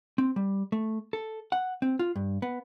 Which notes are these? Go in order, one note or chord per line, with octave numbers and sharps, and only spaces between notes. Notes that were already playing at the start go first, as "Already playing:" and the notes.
C4
G3
A3
A4
F#5
C4
F4
G2
B3